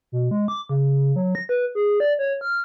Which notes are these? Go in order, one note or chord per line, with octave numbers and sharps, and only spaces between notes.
B2
G#3
D6
C#3
F#3
A#6
B4
G#4
D5
C#5
F6